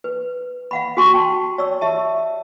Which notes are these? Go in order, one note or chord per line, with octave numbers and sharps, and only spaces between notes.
B4
F5 F#5 B5
F#4 G4 G#5 C6 C#6
G5 A5
C#5 D5 E6
G4 E5 A5